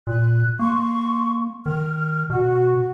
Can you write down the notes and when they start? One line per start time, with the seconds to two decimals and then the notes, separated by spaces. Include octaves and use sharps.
0.07 A#2 F#6
0.59 A#3 C6 C#6
1.66 D#3 F6
2.30 B2 F#4